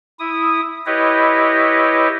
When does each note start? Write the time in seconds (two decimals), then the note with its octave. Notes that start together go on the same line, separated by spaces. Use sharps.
0.19 E4 D#6
0.86 E4 G4 B4 C#5 D#5